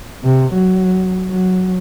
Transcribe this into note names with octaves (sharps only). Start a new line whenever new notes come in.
C3
F#3
F#3